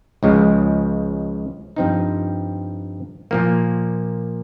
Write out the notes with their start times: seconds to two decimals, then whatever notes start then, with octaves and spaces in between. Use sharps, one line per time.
0.23 C#2 C#3 F3 G#3
1.76 G2 F3 C4 D#4
3.31 A#2 F3 A#3